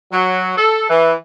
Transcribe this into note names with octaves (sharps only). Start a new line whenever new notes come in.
F#3
A4
E3